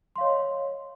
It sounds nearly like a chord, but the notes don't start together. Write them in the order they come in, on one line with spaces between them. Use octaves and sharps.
C6 F5 C#5 D#5